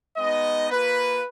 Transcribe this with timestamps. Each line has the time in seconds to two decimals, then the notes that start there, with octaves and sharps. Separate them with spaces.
0.17 G#3 B3 D#4 D#5
0.70 A#3 F4 B4